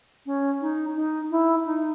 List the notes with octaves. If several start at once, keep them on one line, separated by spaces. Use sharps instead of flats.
C#4
D#4
D#4
E4
D#4